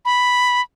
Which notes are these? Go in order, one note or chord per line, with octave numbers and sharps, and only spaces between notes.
B5